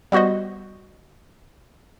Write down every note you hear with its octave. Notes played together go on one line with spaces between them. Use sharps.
G3 B3 F#4 C5 D#5